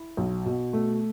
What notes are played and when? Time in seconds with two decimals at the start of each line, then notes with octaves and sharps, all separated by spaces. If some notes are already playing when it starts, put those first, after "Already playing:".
Already playing: E4
0.17 B1
0.46 B2
0.73 A3